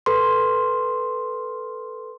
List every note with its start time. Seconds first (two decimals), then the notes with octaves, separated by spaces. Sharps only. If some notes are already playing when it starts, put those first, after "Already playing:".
0.06 A4 B4 C6